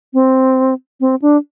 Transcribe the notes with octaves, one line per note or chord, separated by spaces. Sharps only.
C4
C4
D4